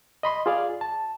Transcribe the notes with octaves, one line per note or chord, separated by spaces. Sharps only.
D#5 B5 C6
F4 G#4 D5 F5
A5